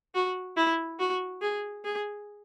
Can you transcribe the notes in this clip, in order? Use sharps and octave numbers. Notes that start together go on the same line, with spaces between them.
F#4
E4
F#4
G#4
G#4